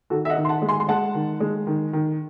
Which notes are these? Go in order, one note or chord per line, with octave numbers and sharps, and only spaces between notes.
D#3 F#4 A4
E5
D#5 F#5
D#3
C6
F#5 A5
G#3
G#5 C6
C6
G#3 F#5 A5
D#3
G#3
D#3
D#3